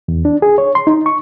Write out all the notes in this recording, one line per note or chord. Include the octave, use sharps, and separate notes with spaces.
E2
D4
G#4
C#5
C6
D#4
C#6